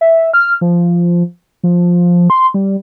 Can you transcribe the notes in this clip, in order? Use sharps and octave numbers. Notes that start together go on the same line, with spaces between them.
E5
F6
F3
F3
C6
G3